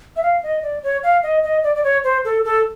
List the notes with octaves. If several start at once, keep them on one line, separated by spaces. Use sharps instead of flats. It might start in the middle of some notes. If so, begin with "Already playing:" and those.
E5
F5
D#5
D5
C#5
F5
D#5
D#5
D5
D5
C#5
C5
A4
A4